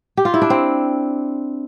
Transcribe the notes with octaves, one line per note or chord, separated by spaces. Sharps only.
G4
F4
E4
D4
C4